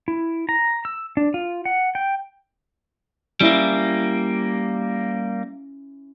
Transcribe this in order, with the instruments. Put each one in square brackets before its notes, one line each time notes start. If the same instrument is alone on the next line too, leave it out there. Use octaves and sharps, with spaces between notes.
[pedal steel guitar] E4
A#5
E6
D4
F4
F#5
G5
[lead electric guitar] G3 A#3 [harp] C#4 E4 E5